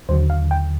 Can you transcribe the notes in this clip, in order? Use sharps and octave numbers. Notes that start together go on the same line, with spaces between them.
D#2 D3 F#3 C5
F5
G5